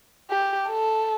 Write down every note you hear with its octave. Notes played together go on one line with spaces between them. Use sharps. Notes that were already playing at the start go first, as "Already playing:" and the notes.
G4
A4